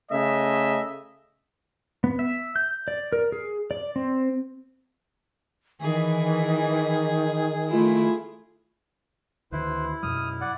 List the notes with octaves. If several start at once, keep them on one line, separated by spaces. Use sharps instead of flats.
C#3 A3 D#5 E5
B3
E5
G6
D5
A#4
G#4
D5
C4
D#3 E3 G#4
A3 E4 F4
D2 D#3 E4 B4 C5
F#2 B2 F#3 D#6 F6
D5 F#5